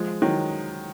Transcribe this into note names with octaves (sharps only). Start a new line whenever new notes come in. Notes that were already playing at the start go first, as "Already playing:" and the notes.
Already playing: F3 G#3
D#3 F#3